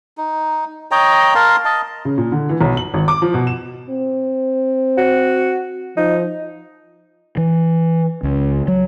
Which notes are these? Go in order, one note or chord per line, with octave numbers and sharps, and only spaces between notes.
D#4
C#5 D#5 G5 A#5
A#4 F5 A5 C6
D#5 A5
C#3
A#2
D3
E3
B1
F#7
G#1
D6
F3
B2
E7
C4
F#4
F3 D#4
E3
C#2
F#3